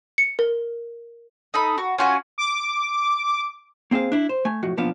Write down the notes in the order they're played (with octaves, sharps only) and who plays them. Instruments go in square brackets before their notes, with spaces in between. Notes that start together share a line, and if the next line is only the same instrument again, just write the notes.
[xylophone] C#7
A#4
[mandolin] D#4 A4 B5
F#4
C#4 F4 F#4 G#5
[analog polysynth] D6
[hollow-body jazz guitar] A#3 C4 G#4 C5 F5
D4 E4
C5
A3 G#5
B1 F2 A2 F#4
B1 A#2 F3 B3 D4 F5